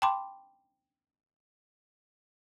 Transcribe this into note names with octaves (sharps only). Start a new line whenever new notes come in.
G5 A5 B5 C6 D6